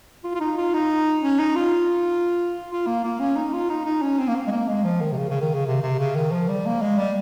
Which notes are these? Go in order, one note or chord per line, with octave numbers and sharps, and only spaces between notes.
F4
F4
D#4
F4
D#4
C#4
D#4
F4
F4
A#3
A#3
C#4
D#4
F4
D#4
D#4
C#4
C4
A#3
C4
G#3
A#3
G#3
F3
D#3
C3
C#3
C#3
D#3
C#3
C3
C3
C#3
D#3
F3
G3
A#3
G#3
G3